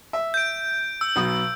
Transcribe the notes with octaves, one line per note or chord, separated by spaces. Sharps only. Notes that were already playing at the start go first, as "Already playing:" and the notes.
E5
G6 D7
E6
B1 B2 D#6